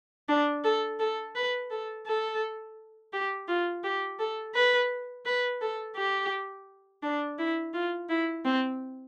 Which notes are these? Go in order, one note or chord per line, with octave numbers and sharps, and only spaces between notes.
D4
A4
A4
B4
A4
A4
G4
F4
G4
A4
B4
B4
A4
G4
D4
E4
F4
E4
C4